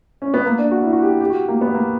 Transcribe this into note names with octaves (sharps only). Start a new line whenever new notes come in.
C#4
B3
A#3
D4
F#4
E4
F#4
G4
G4
F#4
A#3
B3
A#3